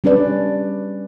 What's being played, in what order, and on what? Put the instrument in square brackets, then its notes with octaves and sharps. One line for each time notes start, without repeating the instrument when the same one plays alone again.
[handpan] G3 C#4 D4 B4 D5